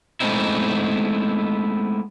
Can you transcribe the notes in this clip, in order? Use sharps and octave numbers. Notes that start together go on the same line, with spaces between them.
G#3 A3 B3 C4 D#4 E4